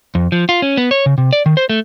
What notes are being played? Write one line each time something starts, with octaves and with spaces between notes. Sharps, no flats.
F2
F3
F4
C#4
B3
C#5
C#3
C3
D5
D#3
C5
A3